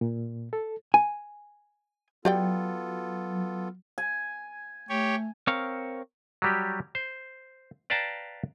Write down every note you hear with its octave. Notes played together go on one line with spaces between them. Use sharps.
A#2
A4
G#5
F#3 B3 F4 G4 A4 D5 G5
G#5
A3 G4 C#5
C4 A#4 C#5 F5
F#3 G3 G4
C5
B4 D5 F5 G5 A5 A#5